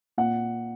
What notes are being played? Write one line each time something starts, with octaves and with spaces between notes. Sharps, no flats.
A#2 F#5